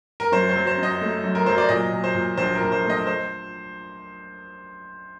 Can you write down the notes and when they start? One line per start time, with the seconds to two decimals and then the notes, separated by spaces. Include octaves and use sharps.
0.20 A#4
0.32 F#2 C5
0.49 C5
0.56 F#3
0.67 C5
0.78 F#2
0.83 D#5
1.01 A3
1.23 F#2
1.35 A#4
1.46 F#3 C5
1.58 D5
1.69 A#2 D#5
1.93 A#2
2.04 C5
2.15 A#2
2.37 A#1 C5
2.55 A#4
2.60 A#1
2.72 C5
2.83 A3
2.90 D#5
3.07 C5